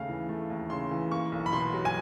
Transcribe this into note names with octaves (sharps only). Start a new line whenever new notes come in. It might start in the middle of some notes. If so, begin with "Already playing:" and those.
Already playing: D#2 C#3 A3 F5
E3
A3
D#2
C#3 C6
E3
A#3 C#6
B1
B5
B2 C6
F#3
G#5